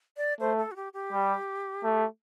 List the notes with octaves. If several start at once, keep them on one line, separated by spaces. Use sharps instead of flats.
D5
A3 C5
A4
F#4
G4
G4
G3
A3